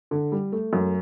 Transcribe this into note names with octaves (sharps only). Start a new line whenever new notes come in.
D3
G3
A3
F#2